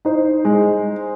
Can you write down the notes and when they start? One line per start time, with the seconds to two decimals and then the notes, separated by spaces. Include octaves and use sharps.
0.05 D#4 C5
0.45 G#3